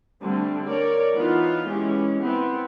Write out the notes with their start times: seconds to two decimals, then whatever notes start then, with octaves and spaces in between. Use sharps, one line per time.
0.22 D3 G3 A3 C4
0.68 A#4 C#5 D5
1.15 E3 B3 D#4 F4
1.67 E3 G#3 C#4 G4
2.20 B3 C4 E4